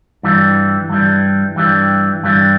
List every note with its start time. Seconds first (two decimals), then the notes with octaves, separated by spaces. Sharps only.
0.23 G2 E3 G3
0.89 G2 E3 G3
1.56 G2 E3 G3
2.23 G2 E3 G3